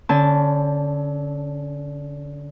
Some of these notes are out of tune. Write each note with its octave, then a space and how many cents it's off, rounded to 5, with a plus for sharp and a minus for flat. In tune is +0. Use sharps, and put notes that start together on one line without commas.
D3 -20 C#4 +5 A5 +0